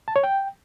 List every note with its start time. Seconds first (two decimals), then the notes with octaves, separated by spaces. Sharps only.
0.08 A5
0.16 C#5
0.24 G5